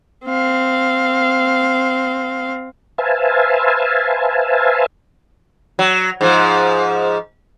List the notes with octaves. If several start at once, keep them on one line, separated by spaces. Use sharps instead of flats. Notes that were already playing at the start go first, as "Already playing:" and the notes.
C4 F5
B4 C5 E5 F5 G#5 A5
F#3
G#2 F3